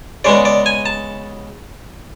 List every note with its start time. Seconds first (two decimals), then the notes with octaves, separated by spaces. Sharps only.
0.24 C#3 G#3 B3 D5
0.45 D5
0.66 G#5
0.86 A5